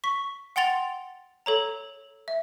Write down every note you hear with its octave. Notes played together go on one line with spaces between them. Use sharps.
C#6 B6
F#5 G5 C6 A6 F7
A4 C#5 A#5
E5